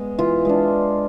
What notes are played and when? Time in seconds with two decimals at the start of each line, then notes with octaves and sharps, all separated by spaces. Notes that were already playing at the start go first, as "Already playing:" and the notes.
Already playing: G#3 B3
0.19 E3 F4
0.45 G#3 B3 D4